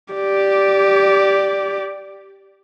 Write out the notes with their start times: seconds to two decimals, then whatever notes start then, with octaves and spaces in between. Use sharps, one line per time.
0.14 G4 D5